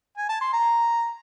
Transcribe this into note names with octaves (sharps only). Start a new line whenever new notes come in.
G#5
A5
C6
A#5